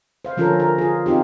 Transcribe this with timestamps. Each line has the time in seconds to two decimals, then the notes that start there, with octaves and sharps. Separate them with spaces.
0.25 C5 F5
0.37 D3 F3 C#4 F4 A4 A#4
0.60 A#4
0.78 F4 G#4
1.06 C4 D#4 F4 G4